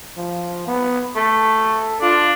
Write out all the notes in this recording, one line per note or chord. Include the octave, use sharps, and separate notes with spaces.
F3
B3
A3 A4
D4 F4